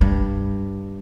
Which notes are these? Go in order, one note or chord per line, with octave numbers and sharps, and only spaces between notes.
G2